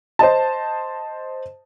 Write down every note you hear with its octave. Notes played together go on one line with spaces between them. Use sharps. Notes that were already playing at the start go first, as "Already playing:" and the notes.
C5 D#5 A5